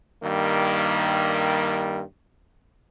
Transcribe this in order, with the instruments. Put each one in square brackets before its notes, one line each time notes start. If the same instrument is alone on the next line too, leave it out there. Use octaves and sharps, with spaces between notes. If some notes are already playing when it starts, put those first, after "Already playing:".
[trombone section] G2 D#3 G3 A#3